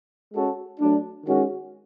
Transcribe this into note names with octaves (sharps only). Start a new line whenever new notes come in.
G#3 C#4 F#4 A4
F#3 A3 D4
D#3 G#3 C#4 F#4